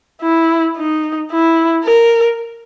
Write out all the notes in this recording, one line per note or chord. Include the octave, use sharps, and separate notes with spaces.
E4
D#4
E4
A#4